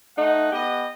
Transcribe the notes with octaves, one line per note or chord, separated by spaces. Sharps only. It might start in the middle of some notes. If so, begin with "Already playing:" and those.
A3 D#4 F#5
B3 G4 D#5